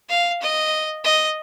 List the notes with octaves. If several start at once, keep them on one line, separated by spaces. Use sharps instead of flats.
F5
D#5
D#5